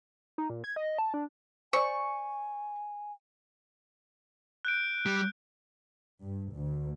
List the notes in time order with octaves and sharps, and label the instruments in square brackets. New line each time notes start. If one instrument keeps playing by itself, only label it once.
[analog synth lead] D#4
A#2
G#6
D#5
A5
D4
[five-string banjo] C5 D5 [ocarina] G#5 [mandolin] C#6
[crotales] F#6 G6 D7
[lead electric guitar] G3
[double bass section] G2
D2